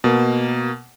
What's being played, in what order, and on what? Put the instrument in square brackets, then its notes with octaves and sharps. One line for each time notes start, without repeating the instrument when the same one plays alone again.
[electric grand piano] B2 A#3